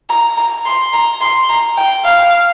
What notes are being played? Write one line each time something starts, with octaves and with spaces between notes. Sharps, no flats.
A#5
A#5
C6
A#5
C6
A#5
G5
F5